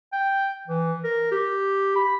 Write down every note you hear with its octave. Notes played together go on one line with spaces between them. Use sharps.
G5
E3
A#4
G4
B5